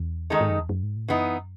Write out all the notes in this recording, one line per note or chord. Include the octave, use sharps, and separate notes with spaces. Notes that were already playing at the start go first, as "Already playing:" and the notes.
Already playing: E2
D#3 G#3 D#4 A4
G#2
F#2
E2
F#2
G#2
A2
F#2 E3 B3 D#4